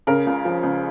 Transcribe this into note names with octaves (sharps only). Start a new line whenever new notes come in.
C#3 A#4
C#2
F3
C#2